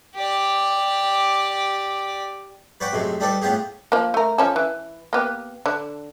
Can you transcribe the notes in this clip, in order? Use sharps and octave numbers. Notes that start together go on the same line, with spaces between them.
G4 D5
B4 C#5 D5 F#5 G5 B5
F#2 C3 G#3 A3
G3 D4 D#4 A4 B4 D5
A2 B3 F4 G4 G#4
F3 A#3
A3 A#4
F3 C#4 A4
E3
A#3 B3 G4
D3 D4